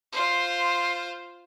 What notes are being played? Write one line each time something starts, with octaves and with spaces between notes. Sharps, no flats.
F4 C5